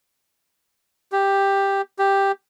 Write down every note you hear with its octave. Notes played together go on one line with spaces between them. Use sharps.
G4
G4